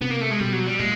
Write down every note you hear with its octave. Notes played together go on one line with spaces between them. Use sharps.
C3 B3
A#3
A3
G#3
B2 G3
F#3
G3
A#2 G#3